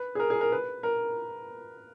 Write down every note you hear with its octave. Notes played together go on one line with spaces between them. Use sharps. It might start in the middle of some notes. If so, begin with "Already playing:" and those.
Already playing: B4
G#4
A#4
G#4
A#4
B4
A#4